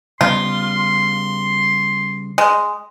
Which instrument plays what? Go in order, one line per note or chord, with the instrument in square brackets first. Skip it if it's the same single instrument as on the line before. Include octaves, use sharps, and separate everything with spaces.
[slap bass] C#3 G3 B3 [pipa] F4 [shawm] C6
[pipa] G#3